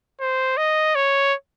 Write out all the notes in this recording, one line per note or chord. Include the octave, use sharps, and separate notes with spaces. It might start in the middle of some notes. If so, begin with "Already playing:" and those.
C5
D#5
C#5